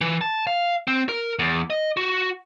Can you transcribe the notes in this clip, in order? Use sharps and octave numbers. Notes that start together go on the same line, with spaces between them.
E3
A5
F5
C4
A#4
E2
D#5
F#4